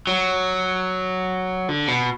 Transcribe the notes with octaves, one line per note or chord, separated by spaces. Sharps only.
F#3
D3
B2